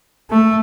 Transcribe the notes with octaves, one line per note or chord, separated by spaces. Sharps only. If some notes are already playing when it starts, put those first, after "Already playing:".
A3